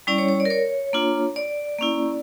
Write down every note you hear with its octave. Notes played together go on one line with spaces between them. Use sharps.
G3 C#4 E4 D5
C#5
C#5
D5
A#4
C#5
A#3 D4 F4
D5
A#3 C#4 E4